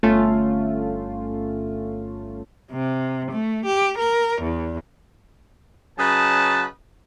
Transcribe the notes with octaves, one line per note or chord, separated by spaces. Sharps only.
G1 A3 C#4 F4
C3
A3
G4
A#4
E2
C#3 F#3 B4 D#5 A5